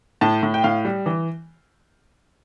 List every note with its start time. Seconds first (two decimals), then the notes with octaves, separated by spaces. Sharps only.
0.21 A2 A5
0.43 A2
0.54 G5
0.64 A2 F5
0.85 G3
1.06 E3